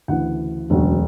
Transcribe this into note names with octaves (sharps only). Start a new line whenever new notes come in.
D2 C#3 E3 F#5
E1 D2 C#3 F#3